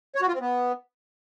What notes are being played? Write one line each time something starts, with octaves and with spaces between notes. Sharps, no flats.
C#5
F#4
F4
C4
B3